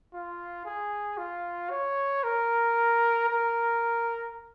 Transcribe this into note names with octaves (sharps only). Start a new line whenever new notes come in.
F4
G#4
F4
C#5
A#4
A#4